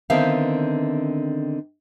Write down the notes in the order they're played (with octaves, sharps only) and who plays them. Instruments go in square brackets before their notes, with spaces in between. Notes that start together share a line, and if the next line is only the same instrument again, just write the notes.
[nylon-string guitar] D3 D#3 B3 C4 E5 F5